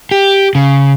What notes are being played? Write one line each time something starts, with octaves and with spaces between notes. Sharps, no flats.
G4
C#3